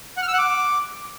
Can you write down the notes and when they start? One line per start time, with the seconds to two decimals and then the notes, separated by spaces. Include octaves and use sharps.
0.17 F#5
0.22 F6
0.28 E6
0.33 F#5
0.38 D6